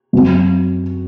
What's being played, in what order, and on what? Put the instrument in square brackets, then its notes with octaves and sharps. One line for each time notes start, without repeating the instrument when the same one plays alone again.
[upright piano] F#2 F#3 C4 F#4